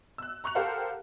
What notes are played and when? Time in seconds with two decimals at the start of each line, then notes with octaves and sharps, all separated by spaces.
0.18 E6 F#6
0.44 A#5 C#6 F#6 F7
0.55 G4 A4 A#4 C5 F5 F#5